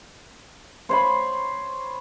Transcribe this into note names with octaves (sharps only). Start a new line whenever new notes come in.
C5 C#5 B5